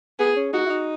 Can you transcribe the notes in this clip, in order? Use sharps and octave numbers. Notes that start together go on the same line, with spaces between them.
B3 G#4
C#4
D#4 F#4
E4
D#4